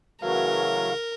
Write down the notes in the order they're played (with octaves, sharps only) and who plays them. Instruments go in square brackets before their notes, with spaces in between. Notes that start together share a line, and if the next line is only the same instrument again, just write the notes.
[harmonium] C#3 E3 A3 [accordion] F#3 [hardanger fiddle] A#4 [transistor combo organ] F5